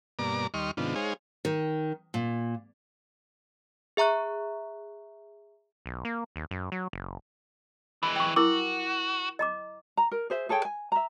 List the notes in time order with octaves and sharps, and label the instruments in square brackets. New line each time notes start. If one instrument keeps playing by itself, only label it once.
[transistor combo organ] G2 B2 A#3 D5 A#5 D6
D#2 G3 D#5 C6 C#6 F6
G#2 C3 D#3 B3 D4 F4
G#3 D#4 G#4 C5 C#5 F5
[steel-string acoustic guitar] D#3
A#2
[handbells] G#4 E5 A#5 C#6 F#6
[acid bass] B1
A#3
D#2
F#2
F#3
F#1
[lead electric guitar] E3 G#3 [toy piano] B5
[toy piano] G5 C#6
[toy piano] E4 A#4 D6 [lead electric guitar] F#4
[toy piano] D#5 A#5 D6
[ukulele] A#5
A#4
G#4 C5 E5
G#4 A4 C#5 G5
G#5
E5 A#5